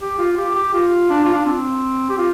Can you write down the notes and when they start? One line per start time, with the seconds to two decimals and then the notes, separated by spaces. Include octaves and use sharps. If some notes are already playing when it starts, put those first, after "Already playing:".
0.01 G4
0.19 F4
0.38 G4
0.55 G4
0.74 F4
1.10 D4
1.25 F4
1.35 D4
1.46 C4
2.10 G4
2.18 F4